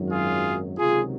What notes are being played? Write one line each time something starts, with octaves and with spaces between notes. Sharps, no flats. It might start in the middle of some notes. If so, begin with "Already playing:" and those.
Already playing: G#1 F#2 D#3 F#3
F4 G#4
C#2 C3 D#3 F#3 F4 G#4